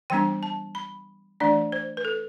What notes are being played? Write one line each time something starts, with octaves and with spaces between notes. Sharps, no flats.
E3 G3 B3 D4 G5
A5
B5
E3 A3 D4 D5
C5
B4
A4